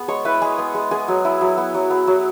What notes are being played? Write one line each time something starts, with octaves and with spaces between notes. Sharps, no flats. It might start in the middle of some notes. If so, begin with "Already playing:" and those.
Already playing: B3 G#4 G#5
G#3 C#5 C#6
E4 B4 B5
G#3 G#4 G#5
B3
G#3
B3 G#4 G#5
F#3
E4
F#3
B3
F#3
B3
F#3